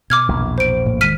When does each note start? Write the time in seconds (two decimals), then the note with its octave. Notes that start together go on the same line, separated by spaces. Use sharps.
0.10 B2 D6 F6 G#6
0.29 A#1 E2
0.58 C5 D7
0.86 A2 A#3
1.01 E1 D#3 G#3 F6 B6 D#7